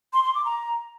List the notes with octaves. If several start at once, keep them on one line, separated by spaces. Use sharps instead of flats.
C6
C6
D6
A#5